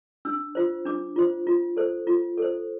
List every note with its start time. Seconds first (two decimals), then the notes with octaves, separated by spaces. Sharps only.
0.25 D4 E6
0.55 F4 C5
0.85 D4 D6
1.16 F4 C5
1.47 F4
1.77 A4 C5
2.07 F4
2.37 A4 C5